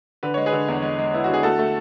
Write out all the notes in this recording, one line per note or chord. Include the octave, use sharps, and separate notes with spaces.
D3 B4
G#3 C#5
G#4 B4
D3
E2
G#3
G#3
B3 E4
D3 F#4
G#4
A3 F#4 A4
A3